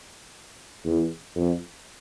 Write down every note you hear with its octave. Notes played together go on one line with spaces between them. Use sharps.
E2
F2